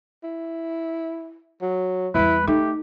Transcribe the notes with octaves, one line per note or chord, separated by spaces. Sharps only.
E4
F#3
E2 G3 E4 B4
A3 D#4 G4